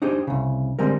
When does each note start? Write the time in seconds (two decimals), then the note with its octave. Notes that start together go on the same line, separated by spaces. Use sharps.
0.02 D4 D#4 G4 G#4 C5
0.27 C2 C#3
0.79 D3 G3 G#3 C4 A#4